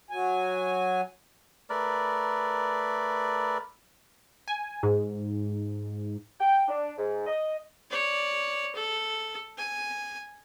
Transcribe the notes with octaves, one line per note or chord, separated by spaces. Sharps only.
F#3 G#5
A3 A#4 B4 D5
G#5
G#2
G5
D4
G#2
D#5
C#5 D5
A4
G#5